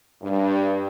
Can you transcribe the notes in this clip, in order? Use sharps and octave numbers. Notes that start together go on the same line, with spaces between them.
G2